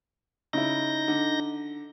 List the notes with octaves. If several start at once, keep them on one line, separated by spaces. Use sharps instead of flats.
C#3 D#4 E4 G6 A#6
D3